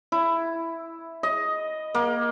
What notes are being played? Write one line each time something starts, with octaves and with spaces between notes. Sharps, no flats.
E4
D#5
A#3